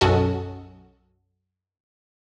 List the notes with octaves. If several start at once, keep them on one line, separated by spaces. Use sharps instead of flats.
B1 F#2 C#4 F#4 A4 D#5